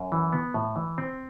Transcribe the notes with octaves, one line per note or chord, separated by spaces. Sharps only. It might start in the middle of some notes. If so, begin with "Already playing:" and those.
Already playing: F#2
E3
B3
A2
E3
C4